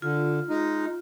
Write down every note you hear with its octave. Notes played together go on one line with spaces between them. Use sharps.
D3 F4
G#3 D#4